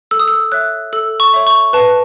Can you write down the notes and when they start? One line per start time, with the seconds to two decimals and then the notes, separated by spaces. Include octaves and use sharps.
0.11 A4 E6
0.19 D#6
0.28 E6
0.52 C#5 E5 F#6
0.93 A4 E6
1.20 C#6
1.34 C#5 E5
1.47 C#6
1.73 B4 A5